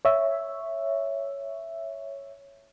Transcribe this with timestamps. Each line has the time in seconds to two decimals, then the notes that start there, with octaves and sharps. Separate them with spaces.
0.05 C#5 E5